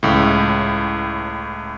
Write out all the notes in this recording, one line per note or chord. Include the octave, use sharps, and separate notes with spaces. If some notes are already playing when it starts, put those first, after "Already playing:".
C#2 A2